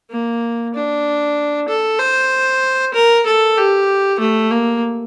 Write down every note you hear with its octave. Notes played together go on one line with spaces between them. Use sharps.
A#3
D4
A4
C5
A#4
A4
G4
A3
A#3